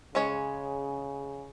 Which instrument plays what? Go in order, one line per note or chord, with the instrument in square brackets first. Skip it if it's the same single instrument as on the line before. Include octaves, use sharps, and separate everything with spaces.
[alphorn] C#3 [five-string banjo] G#3 C#4 C#5